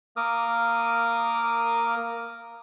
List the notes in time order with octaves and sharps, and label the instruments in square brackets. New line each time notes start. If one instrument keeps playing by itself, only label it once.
[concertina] A#3 A#4 D6 D#6 F6